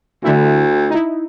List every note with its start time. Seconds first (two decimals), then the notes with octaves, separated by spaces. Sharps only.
0.24 D2 D3 A3 E4
0.90 D#4 E4